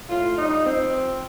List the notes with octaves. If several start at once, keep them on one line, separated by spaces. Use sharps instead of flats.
A2 F4
G3 D#4
F3 C4
F3